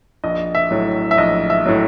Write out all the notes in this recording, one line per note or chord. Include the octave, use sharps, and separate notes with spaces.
A#1 D#5
E5
A2 F#3
E5
A#1 D#5
E5
A2 F#3